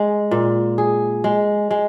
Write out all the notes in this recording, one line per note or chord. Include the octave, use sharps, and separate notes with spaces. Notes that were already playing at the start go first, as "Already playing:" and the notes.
Already playing: G#3
A#2
G#4
G#3
G#3